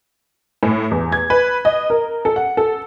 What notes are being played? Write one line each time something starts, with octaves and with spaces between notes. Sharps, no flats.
A2
E2
G#6
B4
D#5
A#4
A4
F#5
A4